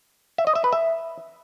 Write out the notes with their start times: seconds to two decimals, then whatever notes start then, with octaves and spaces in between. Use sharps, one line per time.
0.38 E5
0.47 D#5
0.55 E5
0.64 B4
0.73 E5